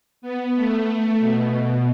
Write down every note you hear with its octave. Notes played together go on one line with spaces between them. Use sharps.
B3
A3
B2